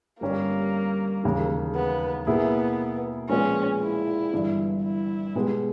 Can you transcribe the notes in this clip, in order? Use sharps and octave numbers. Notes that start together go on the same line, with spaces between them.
G1 G2 G3 A#3 C#4
E1 D#2 C#3
B3
B2 A#3 B3 E4 G#4
A#1 A#2 G#3 B3 C#4
E4
G1 G2 E3
E4
B2 G#3 B3 G4